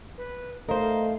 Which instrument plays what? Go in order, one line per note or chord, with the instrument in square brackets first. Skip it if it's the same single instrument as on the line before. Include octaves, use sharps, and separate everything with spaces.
[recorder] B4
[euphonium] A3 [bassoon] D#4 [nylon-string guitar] A#4 C5 [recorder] F5